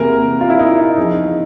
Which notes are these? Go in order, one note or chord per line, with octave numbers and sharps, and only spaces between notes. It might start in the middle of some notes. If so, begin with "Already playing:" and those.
Already playing: E2 C3 E3 A#3 A#4
F4
E4
D#4
E4
E2 C#3 F3 D#4